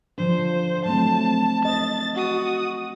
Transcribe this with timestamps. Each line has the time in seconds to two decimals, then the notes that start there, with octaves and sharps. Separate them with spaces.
0.18 D3 F3 D4 C5
0.85 F#3 A3 C4 A5
1.65 D#5 A6
2.15 F#4 D#6